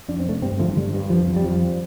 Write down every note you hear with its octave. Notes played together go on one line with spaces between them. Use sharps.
F2 D4
C4
C3 A3 D4
G2 G3 C4
D3 F3 A3
G2 D3 G3
G2
F2 F3
F2
G3
F2 F3